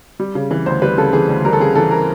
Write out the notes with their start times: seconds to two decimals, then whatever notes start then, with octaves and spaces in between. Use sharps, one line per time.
0.20 G3
0.35 C#3
0.51 E3
0.66 D2 C5
0.82 G3 B4
0.98 C#3 A4
1.13 E3 G#4
1.29 D2
1.45 G3 A#4
1.53 A4
1.60 C#3 G#4
1.75 E3 A4
1.91 A#4